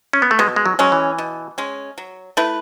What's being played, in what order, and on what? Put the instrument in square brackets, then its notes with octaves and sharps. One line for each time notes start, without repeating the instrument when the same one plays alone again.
[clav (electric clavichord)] C#4
B3
A3
[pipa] B2 [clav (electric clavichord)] G#3
[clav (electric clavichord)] G#3
F#3
[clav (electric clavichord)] F#3 [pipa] G#3 C#4
[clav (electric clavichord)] E3
[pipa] B2
G#3 C#4
F#3
A3 E4 B4